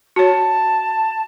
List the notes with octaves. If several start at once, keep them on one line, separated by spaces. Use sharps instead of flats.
F#4 C#5 A5